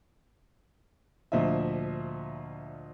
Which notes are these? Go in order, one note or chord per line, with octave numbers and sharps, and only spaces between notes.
D2 A#2 F3 D#5 E5